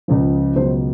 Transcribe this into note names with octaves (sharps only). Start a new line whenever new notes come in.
C#2 C#3 F3
C#2 B2 F#3 C5